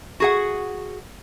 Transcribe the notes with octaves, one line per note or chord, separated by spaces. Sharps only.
F#4 G#4 F#5